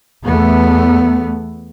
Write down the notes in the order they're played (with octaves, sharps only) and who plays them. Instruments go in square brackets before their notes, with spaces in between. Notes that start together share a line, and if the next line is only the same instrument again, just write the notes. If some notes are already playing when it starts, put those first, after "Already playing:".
[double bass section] E2 A3 B3